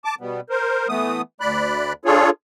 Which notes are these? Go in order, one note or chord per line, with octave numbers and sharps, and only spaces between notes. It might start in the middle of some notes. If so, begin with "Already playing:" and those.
A5 D6
B2 G3 B3
A#4 C5
E3 A3 B3 D#6
D2 D5 B5 F#6
D4 F4 G#4 A4 C#5